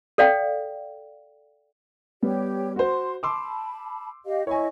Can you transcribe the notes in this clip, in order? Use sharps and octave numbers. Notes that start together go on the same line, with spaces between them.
A4 D5 F5 G5
G3 B3 G4 C#5
F#4 C5 C6
A5 B5 C6 D6 E6
G4 D#5 F5
E4 C#5 D#5 G#5 C#6